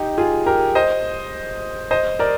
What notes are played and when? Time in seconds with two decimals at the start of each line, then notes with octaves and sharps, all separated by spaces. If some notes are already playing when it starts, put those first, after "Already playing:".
Already playing: D#4 G4
0.18 F4 G#4
0.46 G4 A#4
0.75 C5 D#5
1.91 C5 D#5
2.19 A#4 D5